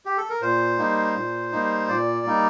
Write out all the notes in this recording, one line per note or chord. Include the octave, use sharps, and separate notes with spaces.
G4
A4
A#4
A#2 C5
G3 A#3 D#4
A#2
G3 A#3 D#4
A#2 D5
G3 A#3 D#4